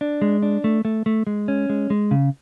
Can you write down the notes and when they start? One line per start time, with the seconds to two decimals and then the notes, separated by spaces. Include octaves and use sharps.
0.01 D4
0.22 G#3
0.43 D4
0.64 A3
0.85 A3
1.06 A3
1.27 G#3
1.48 C#4
1.70 G#3
1.90 G#3
2.11 C#3